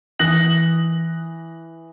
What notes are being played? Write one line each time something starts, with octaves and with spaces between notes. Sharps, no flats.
E3 D#6 F#6 A#6 F#7